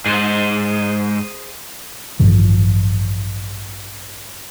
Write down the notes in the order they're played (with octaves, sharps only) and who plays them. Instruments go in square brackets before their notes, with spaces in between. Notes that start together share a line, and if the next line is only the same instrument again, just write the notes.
[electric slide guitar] G#2 [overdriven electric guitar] G#4 C5
[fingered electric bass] A1 G2 D#3 F3